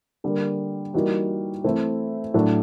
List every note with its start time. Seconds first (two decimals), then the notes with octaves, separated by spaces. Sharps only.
0.24 D3 G3 A#3
0.94 E3 G3 A#3 D#4 F#4
1.64 E3 A3 C4 E4
2.34 A2 F#3 A3 D4